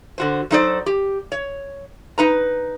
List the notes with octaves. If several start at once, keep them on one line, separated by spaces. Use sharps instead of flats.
D3 F#4 C5
F#3 A3 D#4 A4 C5 D5
G4
C#5
D#4 B4 A#5